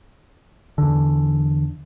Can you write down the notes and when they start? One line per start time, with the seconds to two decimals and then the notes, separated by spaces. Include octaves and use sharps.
0.78 E2 D3